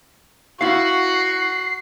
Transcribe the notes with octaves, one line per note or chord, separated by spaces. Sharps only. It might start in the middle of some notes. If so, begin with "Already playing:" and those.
E4 F#4 F5 C7